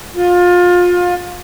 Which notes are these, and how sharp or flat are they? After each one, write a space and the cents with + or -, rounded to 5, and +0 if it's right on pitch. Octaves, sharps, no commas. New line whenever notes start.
F4 +25